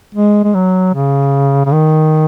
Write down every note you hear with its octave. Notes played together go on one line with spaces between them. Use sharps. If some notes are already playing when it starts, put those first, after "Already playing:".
G#3
G#3
F#3
C#3
C#3
D#3